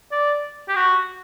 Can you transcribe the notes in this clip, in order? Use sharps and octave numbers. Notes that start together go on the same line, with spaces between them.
D5
G4
F#4